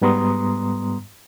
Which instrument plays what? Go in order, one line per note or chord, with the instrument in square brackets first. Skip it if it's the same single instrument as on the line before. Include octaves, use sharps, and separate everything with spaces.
[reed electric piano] G#2 G3 B3 A#5 C6 D#6